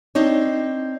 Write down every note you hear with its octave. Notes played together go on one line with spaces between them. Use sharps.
C4 D4 D#4 C#5